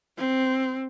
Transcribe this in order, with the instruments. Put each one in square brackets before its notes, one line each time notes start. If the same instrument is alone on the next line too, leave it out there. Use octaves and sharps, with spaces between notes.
[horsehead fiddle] C4